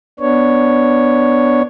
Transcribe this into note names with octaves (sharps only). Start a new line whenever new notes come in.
B3 D4 C#5